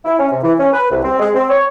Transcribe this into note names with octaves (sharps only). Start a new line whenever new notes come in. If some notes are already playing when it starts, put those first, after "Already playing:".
E4
C#4
C3
E3
C#4
B4
C2
C4
G#3
C4
C#5